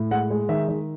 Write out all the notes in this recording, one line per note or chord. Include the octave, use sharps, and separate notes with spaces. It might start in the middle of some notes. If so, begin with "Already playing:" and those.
Already playing: A2
G#3 F#5
G#3
D#3 E5
D#3